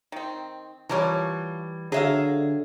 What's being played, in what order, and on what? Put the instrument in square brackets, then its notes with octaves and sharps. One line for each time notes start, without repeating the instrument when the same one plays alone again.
[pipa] D#3 C4
[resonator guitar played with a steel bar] E3 G3 [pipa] F3 A#4 C#5
[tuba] D3 [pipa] F#3 E5 F5 [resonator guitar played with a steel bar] G#4